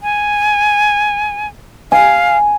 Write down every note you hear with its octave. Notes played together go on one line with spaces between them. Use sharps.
G#5
F5 G#5